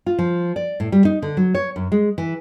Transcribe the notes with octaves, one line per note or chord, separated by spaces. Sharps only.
F4
F3
D5
A2
G3
D#4
D3
F#3
C#5
F#2
G#3
E3